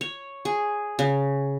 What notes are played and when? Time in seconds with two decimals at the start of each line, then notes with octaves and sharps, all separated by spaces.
0.01 C#5
0.45 G#4
0.99 C#3